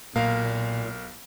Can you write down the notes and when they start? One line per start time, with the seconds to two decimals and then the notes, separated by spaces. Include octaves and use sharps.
0.16 B1 A#2 A#4 F5